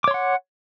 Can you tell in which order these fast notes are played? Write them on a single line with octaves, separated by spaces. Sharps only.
D6 C#5 C6 F#5